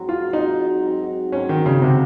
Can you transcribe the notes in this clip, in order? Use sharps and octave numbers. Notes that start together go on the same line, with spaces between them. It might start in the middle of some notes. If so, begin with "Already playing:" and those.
Already playing: G#2 F#3 C4 F#4
F4
G#2 F#3 C4 D#4 F#4
G#2 F#3 C4 F#4
G#2 F#3 C4 C#4 F#4
D#3
C#3
C3 F3 G#3 D#4 F#4